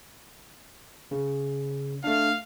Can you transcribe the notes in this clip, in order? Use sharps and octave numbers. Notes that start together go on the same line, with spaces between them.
C#3
A3 D4 F5